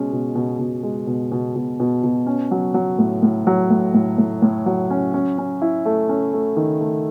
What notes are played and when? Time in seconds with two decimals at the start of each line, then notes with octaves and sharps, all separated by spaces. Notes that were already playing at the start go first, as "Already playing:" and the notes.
Already playing: B2 G#3 C#4
0.12 B2
0.35 B2
0.59 B2
0.83 G#3
1.07 B2
1.32 B2
1.55 B2
1.80 B2
2.04 B2
2.27 C#4
2.51 F#3
2.74 F#3
2.99 A2
3.23 A2
3.47 F#3
3.70 A2
3.94 A2
4.18 A2
4.42 A2
4.66 F#3
4.90 C#4
5.14 C#4
5.38 C#4
5.62 E4
5.86 A3
6.09 C#4
6.33 A3
6.57 D#3
6.80 A3